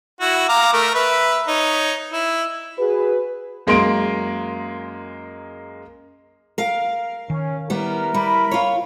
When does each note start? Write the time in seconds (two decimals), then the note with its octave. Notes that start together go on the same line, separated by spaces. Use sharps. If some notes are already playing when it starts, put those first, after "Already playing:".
0.21 E4 F#4
0.49 F5 A#5 D6
0.73 A3 A#4
0.95 B4 E5
1.48 D#4 C#5
2.13 E4
2.79 F#4 G#4 B4
3.67 F#2 G#3 A#3 C6 D7
6.58 A#4 F5
7.30 D#3 C#4
7.70 G3 B3 E4 A#4
8.14 G3 B5
8.51 F4 C#5